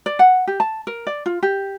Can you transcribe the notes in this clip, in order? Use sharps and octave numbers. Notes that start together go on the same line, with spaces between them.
D5
F#5
G4
A5
A#4
D5
F4
G4